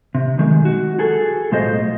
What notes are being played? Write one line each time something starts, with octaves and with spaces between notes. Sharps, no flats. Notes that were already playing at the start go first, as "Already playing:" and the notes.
C3
B1 D#3 G#3
F#4
F#4 G#4 A4
B1 A2 G#3 F4 C5 D#5